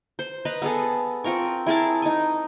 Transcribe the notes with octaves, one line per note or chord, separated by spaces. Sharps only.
C5
B4 D#5 A#5
B3 G#4 A4
C4 F4 A#4 C#6
E4 G#4 A#4 A5
D#4 G#5